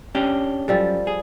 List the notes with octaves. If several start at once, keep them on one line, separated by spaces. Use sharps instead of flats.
C#4 D4 G4
F#2 F3 G3 A4
G#4